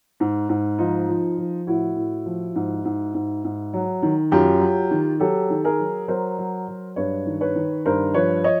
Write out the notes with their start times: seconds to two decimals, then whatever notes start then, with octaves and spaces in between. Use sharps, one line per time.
0.20 G#2
0.49 G#2
0.78 F3 D#4 F4
1.08 F3
1.38 F3
1.67 A2 E4 F#4
1.96 A2
2.26 F3
2.55 G#2
2.85 G#2
3.14 G#2
3.44 G#2
3.73 F#3
4.02 D#3
4.31 F#2 F4 G4
4.61 F#3
4.91 D#3
5.20 F#3 G4 A4
5.50 D#3
5.64 G#4 A#4
5.79 F#3
6.08 F#3 A#4 C5
6.38 F#3
6.68 F#3
6.96 G2 B4 C#5
7.26 D#3
7.41 B4 C#5
7.55 D#3
7.86 G2 A#4 C5
8.14 F3 B4 C#5
8.44 C#5 D#5